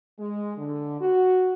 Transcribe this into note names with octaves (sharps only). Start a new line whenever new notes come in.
G#3
D3
F#4